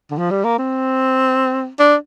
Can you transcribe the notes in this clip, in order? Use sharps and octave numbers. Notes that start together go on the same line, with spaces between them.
D3
F3
G3
A#3
C4
D4